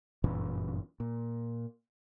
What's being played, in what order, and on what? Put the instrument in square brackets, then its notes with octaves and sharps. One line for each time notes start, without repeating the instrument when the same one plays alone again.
[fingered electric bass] G1 F#2 A#2 E3
A#2